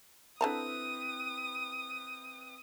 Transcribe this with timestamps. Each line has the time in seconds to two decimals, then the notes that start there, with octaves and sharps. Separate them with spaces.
0.41 D3 C4 E4 B4 A5 A#5 D#6